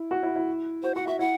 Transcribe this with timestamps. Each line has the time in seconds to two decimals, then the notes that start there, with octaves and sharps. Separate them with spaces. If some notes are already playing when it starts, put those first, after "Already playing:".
Already playing: E4
0.11 F#4
0.23 E4
0.36 E4
0.83 F#4 C5
0.95 F#4 F#5
1.07 F#4 E5
1.19 E4 F#5